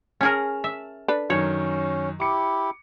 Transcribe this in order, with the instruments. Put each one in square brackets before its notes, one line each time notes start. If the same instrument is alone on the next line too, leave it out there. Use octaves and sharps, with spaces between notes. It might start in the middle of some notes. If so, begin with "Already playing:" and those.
[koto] C#4 G#4 A#4 [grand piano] A5 F6
[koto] E5
[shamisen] D4 A4 B4
[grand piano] F#2 D#3 [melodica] C#4 [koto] C#5
[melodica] E4 G4 [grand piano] D6 C#7